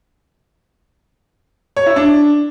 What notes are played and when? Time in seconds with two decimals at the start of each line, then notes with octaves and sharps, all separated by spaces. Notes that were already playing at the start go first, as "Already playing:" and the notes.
1.77 C#5
1.86 E4
1.96 D4